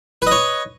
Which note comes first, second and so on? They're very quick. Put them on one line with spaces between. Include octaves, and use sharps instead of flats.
B4 D#5 C#5